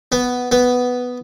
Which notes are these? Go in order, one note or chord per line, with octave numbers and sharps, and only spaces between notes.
B3
B3